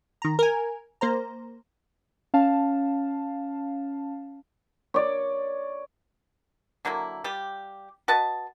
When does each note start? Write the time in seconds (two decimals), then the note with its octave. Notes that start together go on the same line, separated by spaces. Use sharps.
0.22 D#3 A#5
0.39 A#4 G#5
1.01 A#3 C5 A#5
2.34 C#4 F5 A5
4.94 C#5 D5
6.85 D3 F#3 A#3 E4
7.24 G3 F4 G4
8.08 F#4 B4 D#5 A5